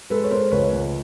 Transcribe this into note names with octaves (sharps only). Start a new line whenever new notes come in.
G#3 A4 B4
C#5
G#3 A#4 C5
C#2 B4 C#5
C#2